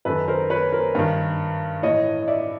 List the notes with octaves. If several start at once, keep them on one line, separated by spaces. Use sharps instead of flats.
F#2 D#3 A4 B4
A#4 C5
B4 C#5
A#4 C5
G2 D#3
A2 E3 C#5 D#5
D#5
D5 E5